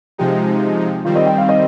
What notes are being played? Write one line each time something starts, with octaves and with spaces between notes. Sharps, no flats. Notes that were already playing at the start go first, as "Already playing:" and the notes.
C3 F3 G#3 D#4 G4
D#3 G3 C4 F4
D#5
G5
F5
D#5